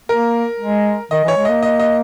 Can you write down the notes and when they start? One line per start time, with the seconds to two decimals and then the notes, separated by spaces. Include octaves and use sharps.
0.09 A#3 A#4
0.60 G#3
1.11 D#3 D#5
1.24 E3
1.28 C#5
1.37 G#3
1.45 A#3 D#5
1.62 D#5
1.79 D#5